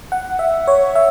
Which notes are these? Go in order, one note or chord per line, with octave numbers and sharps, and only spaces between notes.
F#5
E5
C#5
E5